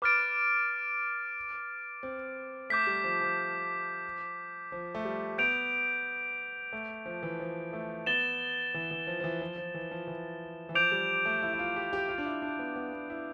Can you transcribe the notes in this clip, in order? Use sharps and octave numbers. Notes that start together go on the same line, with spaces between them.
B4 D6 F6 A6 D7
C4
A3 D6 G6 B6
G3
F3
F3
F3
A3
G3
B3 G6 D7 F7
A3
F3
E3
F3
A3
B3 A6 E7 G7
E3
E3
F3
F3
E3
F3
F3
E3
F3
E3
E3
F3 D6 G6 D7 F7
G3
A3
E4
E4
F4
G4
G4
F4
D4
E4
D4
B3
B3
B3
E4